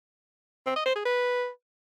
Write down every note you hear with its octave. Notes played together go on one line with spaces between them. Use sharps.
C4
D#5
C5
G#4
B4